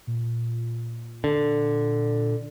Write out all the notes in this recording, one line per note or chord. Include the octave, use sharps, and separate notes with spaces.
A#2
D3